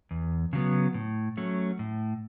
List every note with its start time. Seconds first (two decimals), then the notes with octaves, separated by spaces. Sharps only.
0.11 E2
0.53 C#3 F#3 B3
0.94 A2
1.37 F#3 A3 C#4
1.79 A2